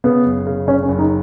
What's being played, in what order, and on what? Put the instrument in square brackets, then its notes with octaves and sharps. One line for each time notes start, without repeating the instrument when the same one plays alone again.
[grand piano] C#3 [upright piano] B3
[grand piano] F#1
C#3
[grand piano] C#3 [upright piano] C#4
[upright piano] C#4
[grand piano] F#1
[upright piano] D#4